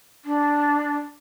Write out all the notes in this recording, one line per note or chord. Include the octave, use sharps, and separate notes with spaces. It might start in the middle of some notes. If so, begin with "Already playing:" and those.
D4